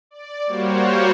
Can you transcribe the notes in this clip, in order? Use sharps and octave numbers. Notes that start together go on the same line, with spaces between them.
D5
G3 A#3 F#4 C5 C#5